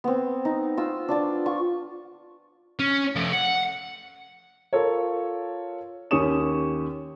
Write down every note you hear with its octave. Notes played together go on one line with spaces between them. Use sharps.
B3 C4
D#4
F4 E6
D4 F4 D5
F4 C#6
C#4
F3 A3
F#5
F4 A4 A#4 C#5
D#2 C#4 G4 C#6 D#6 E7